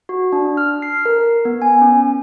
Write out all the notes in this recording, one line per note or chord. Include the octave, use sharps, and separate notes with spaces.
F#4
D4
F6
C7
A#4
B3
G#5
C#4